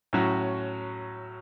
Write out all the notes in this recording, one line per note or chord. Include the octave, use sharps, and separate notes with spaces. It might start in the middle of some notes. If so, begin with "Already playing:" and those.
A2 F#3 C#4 F#4